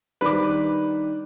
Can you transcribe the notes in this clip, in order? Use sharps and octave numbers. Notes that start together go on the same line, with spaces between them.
D#3 G3 D4 B4 D6